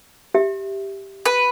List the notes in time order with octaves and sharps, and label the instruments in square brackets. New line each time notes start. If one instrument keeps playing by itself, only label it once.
[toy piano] G4 E5
[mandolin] B4